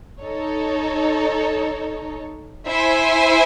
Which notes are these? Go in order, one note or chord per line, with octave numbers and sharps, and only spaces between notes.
D#4 A4 C#5
E4 C5 E5 G#5